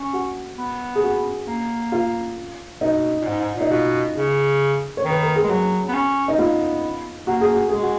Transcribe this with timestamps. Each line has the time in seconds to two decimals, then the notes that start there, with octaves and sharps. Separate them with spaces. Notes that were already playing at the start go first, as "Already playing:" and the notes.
Already playing: C#4
0.13 F#4
0.58 B3
0.95 G#4
1.03 F#4
1.48 A#3
1.92 F4
2.81 B2 D#4
3.22 A#2
3.26 G#2
3.40 G#2
3.55 A#2
3.61 D#4
3.70 B2 F4
4.16 C#3
4.97 C#5
5.05 D#3
5.10 B4
5.23 A#4
5.36 G#4
5.44 G#3
5.49 F#3 F#4
5.88 B3
5.93 C#4
6.28 D#4
6.38 B3 F4
7.27 A#3 F#4
7.41 G#4
7.55 F#4
7.69 G#3 G#4
7.82 F#4